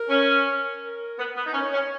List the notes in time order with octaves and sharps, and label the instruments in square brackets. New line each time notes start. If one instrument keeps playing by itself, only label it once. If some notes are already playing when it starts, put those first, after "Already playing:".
Already playing: [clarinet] A#4
[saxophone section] C#4
[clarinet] A#4
[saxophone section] B3
B3
D#4
[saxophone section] C#4 [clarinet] C#5
[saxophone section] C#4